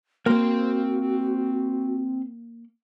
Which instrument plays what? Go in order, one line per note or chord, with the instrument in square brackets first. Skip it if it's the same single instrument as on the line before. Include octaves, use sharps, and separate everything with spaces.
[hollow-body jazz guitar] A#3 [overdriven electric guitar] C4 C6 [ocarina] F#4